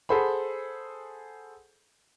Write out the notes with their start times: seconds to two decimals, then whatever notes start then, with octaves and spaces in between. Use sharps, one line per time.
0.09 G#4 A4 C5 F#5 B5